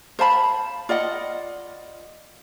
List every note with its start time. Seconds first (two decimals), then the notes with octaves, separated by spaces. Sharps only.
0.19 C5 F5 A5 B5
0.89 F4 D5 D#5 F#5